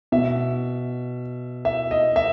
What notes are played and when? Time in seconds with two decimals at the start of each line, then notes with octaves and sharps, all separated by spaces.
0.12 B2 E5
1.65 E5
1.91 D#5
2.16 E5